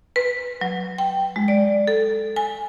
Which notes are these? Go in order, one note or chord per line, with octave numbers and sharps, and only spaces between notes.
B4
F#3
G5
G#3
D5
A4
G#5